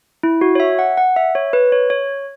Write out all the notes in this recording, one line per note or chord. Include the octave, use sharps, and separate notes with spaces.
E4
F#4
C#5
E5
F#5
F#5
E5
C#5
B4
C#5
C#5